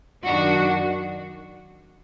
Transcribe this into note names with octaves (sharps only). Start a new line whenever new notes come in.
F#2 D#3 D4 F#4